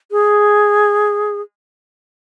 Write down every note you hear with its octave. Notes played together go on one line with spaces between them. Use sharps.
G#4